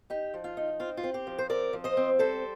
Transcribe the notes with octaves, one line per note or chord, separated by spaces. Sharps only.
D#4 G4
F3
F4
D#4
C4 F4
F4
C4
G4
F3
C5
C4 A#4 D5
F3
C5 D#5
C4
G3 A4 C5